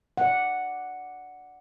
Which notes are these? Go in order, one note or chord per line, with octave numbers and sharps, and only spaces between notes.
D5 F#5